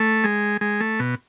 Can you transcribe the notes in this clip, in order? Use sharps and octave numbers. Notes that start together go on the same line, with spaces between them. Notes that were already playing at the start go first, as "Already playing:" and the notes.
Already playing: A3
G#3
G#3
A3
B2